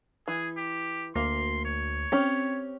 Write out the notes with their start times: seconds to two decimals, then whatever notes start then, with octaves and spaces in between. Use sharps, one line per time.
0.28 E3 G#4
0.57 G4
1.16 D2 A#3 C6
1.65 C#5
2.12 C4 C#4 G4